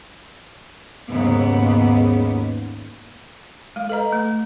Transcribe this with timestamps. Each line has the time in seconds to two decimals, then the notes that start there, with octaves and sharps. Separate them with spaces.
1.10 D#2 G#2 C#3 G#3 B3
3.76 G#3 F5
3.89 A4 B4 D#5 A#5
4.12 A3